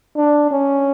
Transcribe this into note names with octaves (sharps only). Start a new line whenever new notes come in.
D4
C#4